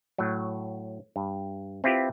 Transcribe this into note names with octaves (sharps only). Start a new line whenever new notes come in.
A2 F#3
G2
C4 E4 F4 G4 B4